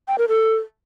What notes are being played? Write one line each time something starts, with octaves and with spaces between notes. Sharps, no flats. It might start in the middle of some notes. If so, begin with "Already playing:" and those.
G5
A#4
A4